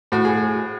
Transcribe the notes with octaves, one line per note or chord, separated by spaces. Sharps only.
A2 F#4
G#4